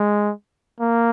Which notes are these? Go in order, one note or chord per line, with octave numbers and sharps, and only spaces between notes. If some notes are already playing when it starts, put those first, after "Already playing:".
Already playing: G#3
A#3